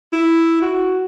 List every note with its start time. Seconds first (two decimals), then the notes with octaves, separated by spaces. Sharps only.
0.13 E4
0.62 F#4